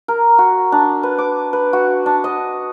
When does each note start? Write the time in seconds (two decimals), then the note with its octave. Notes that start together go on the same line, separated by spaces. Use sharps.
0.08 A#4
0.38 F#4
0.72 D4
1.03 B4
1.18 D6
1.53 B4
1.73 F#4
2.06 D4
2.24 D#5